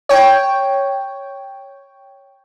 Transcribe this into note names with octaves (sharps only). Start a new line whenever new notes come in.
C#5 G5